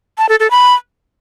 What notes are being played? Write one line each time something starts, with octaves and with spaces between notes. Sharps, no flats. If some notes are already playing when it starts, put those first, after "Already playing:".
A5
A4
A4
B5